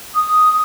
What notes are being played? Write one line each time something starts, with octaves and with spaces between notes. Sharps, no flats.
D#6